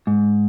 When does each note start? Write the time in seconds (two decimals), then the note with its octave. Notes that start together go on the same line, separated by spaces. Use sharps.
0.07 G#2